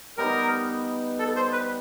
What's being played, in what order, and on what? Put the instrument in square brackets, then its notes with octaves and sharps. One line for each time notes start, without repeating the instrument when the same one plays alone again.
[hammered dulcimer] G3 B3 D#4 [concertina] A#4
[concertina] A4
C5
B4